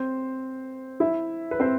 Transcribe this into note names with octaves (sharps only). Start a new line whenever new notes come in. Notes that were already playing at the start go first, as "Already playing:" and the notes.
Already playing: C4 C5
E4 E5
B4
C4 C5